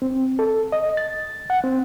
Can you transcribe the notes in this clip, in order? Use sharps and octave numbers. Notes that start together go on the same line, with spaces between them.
C4
A4
D#5
A6
F#5
C4